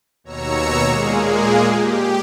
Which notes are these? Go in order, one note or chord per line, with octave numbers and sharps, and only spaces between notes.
D#2 B2 C#5 A#5 E6 C#7
A#2 G#3 A#3 G#4
G4